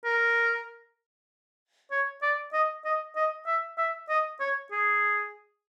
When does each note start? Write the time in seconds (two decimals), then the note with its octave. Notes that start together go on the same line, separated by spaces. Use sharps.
0.05 A#4
1.91 C#5
2.22 D5
2.53 D#5
2.85 D#5
3.16 D#5
3.47 E5
3.78 E5
4.09 D#5
4.40 C#5
4.71 G#4